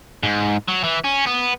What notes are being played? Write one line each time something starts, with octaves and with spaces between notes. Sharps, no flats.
G#2
F#3
E3
C#4
B3